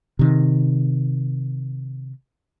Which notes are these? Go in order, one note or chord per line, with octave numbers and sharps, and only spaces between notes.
C3 D#3